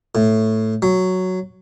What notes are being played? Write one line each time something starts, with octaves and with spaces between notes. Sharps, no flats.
A2
F#3